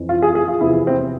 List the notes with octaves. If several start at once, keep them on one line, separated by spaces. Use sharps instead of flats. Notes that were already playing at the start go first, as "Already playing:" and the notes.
Already playing: F2 E3
F4
G#4
G#4
F4
E2 C3 F3 E4
C4